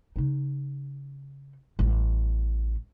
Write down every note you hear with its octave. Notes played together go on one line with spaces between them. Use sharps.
C#3 D#4
A1 G3